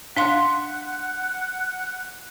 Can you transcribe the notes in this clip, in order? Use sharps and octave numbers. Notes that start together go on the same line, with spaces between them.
D4 F5 F#5 C6